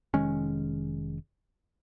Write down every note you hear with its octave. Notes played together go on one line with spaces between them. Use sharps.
F1 D#3 G#3 C#4